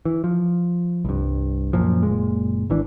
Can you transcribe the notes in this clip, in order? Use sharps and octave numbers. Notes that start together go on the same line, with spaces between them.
E3
F3
C2 G2
F#2 A#2 F3
F#1 A#2 G#3
G#1 E3 D4